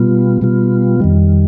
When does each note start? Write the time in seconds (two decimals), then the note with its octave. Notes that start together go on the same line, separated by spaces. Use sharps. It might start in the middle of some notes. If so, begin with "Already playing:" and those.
Already playing: B2 G3 B3 F4
0.41 B2 G3 B3 F4
1.00 F2 D#3 G3